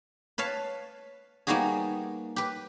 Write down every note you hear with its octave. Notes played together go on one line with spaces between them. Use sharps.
B4 C#5 F5 A5
G3 A#3 B3 D#4 F#4 G#4
G4 B4